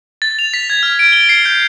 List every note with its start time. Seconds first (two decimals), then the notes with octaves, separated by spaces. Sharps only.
0.22 A6
0.39 F7
0.54 B6
0.70 G#6
0.83 F6
0.99 D7
1.12 G7
1.29 C7
1.45 G6